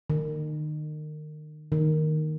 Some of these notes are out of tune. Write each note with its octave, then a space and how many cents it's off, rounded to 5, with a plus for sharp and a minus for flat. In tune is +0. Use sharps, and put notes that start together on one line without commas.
D#3 -35
D#3 -5